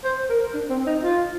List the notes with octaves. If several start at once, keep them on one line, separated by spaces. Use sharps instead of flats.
C5
A#4
D4
C4
D#4
F4